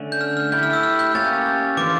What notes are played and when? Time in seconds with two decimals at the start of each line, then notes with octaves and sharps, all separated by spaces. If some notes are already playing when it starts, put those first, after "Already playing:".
Already playing: D3 A3 C#4
0.12 G6
0.21 F6
0.37 F6
0.52 A3 E4 G4 G6
0.63 F6
0.73 E6
0.83 F6
0.99 G6
1.15 A#3 C#4 G4 C#5 A6
1.77 E3 A3 D4 F4 D6